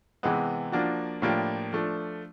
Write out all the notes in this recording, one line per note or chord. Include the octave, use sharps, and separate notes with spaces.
C3 E3 G#3 B3
F3 A#3 D4 F#4
A2 F3 A#3 D4 G4
F3 A3 D4